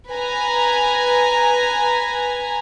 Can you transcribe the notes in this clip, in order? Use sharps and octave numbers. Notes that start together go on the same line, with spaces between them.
B4 G#5 A#5